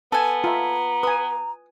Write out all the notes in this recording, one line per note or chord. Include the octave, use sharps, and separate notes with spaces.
B3 A4 G#5 A5
F4 E5 A#5
B4 G#5 D#6